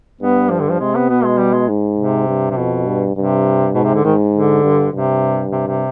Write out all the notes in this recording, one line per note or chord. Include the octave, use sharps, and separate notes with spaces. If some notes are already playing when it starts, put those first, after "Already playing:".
G2 B3
F3
D3
F3
C3 G#3
B3
B2 B3
G#3
G3
G#3
G#2
C3
G2
C3
F2 B2
G2
G2 C3
G#2 B2
C3
D3
G#2 D#3
D3
G2
G2 C3
C3
C3